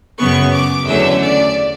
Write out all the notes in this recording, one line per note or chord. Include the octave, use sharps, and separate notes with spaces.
F#2 C#3 F#3 B3 C#6
D6
E2 D3 F#3 A3 C#4 E5
D5